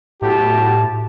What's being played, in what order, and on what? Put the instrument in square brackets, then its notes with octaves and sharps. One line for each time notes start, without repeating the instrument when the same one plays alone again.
[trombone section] B1 F#4 G4 [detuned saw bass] A2 [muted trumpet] A5